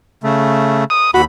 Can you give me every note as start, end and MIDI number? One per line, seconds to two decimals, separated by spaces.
0.24 0.84 49
0.24 0.84 57
0.90 1.11 87
1.14 1.24 39
1.14 1.22 66
1.14 1.24 83